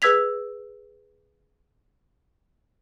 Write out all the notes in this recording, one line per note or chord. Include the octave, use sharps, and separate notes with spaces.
G#4 B4 E6 G#6 B6 F7